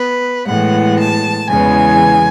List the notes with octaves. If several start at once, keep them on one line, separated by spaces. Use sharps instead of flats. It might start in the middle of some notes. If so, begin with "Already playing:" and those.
Already playing: B3 B4
A2 E3 G#3 B3 F#5
A5
E2 C#3 E3 G#3 B3 G#5